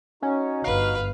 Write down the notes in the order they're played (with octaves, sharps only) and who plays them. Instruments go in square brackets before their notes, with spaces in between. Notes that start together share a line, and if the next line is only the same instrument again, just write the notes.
[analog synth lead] C#4 [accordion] D#4 F#4
[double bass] G1 [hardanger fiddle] B4 [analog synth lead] F5